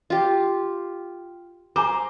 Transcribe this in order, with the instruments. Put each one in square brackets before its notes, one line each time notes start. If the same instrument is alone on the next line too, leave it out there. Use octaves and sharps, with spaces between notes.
[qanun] F4 G4
[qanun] C5 [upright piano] G#5 A#5 D6